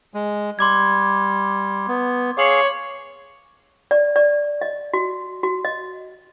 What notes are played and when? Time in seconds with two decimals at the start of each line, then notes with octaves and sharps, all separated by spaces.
0.14 G#3
0.59 G3 C6 D6 G#6
1.88 B3
2.38 G#4 C#5 F5 D6 F#7
3.91 D5
4.16 D5
4.61 D#5
4.93 F#4
5.43 F#4
5.65 D#5